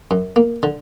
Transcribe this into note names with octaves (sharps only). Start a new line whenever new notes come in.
F#2
A#3
D3